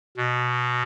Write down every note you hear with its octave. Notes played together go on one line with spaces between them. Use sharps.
B2